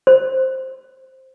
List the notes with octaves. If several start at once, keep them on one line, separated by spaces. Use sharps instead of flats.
C5